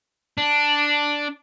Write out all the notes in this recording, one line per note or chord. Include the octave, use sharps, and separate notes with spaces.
D4